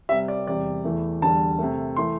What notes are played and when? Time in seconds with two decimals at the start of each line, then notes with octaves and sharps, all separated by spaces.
0.09 C3 G3 E5
0.28 D5
0.47 E2 C3 G3 D5
0.85 E2 E3 A3
1.22 E2 D3 G3 A5
1.58 C3 A3
1.96 E3 A3 C6